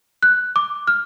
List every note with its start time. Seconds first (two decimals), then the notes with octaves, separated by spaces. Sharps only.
0.23 F#6
0.56 D6
0.87 F6